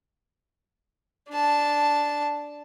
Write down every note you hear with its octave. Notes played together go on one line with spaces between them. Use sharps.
D4 A5